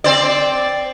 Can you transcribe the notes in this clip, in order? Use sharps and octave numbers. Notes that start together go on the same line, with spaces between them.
C4 C5 D5